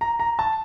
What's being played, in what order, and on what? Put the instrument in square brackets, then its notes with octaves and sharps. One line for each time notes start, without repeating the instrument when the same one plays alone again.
[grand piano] A#5
A#5
A5